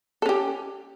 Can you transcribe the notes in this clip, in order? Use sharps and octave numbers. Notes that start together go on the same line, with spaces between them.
C#4 G4 A4